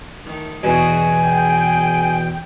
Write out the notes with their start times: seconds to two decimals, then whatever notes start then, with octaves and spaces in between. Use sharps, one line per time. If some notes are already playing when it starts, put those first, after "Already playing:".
0.25 D#3 A3
0.63 E2 B2 F#4 G#4 G#5
1.18 G#4 G5